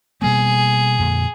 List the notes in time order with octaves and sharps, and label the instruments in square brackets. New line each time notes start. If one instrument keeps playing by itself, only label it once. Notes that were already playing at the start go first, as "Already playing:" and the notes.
[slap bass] B2 G3 A#3 [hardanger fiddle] G#4
[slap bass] F2 A#2 D3